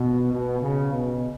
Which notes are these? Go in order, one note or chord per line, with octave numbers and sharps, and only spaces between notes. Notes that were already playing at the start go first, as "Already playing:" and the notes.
Already playing: B2
B2
C#3
B2